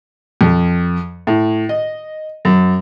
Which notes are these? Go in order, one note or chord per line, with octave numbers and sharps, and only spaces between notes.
F2
A2
D#5
F#2